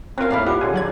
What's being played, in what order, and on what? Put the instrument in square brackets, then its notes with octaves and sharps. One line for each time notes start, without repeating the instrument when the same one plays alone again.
[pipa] F#3 F5 [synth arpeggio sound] C4 F4 A#4 [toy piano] C5
[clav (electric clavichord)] D#2 A2 [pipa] E4 D5 F5
[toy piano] F4 B5 D6 [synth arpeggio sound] G4 [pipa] F#5
[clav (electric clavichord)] D3 G#5 [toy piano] G#4 C#5 G5
[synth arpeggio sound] F#3 D5 G#6